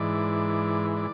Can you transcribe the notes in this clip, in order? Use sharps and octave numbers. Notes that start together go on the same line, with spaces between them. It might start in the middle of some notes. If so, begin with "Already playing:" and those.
Already playing: G#2 E3 D5
D5